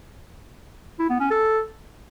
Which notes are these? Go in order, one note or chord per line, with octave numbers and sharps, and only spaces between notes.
E4
B3
C#4
A4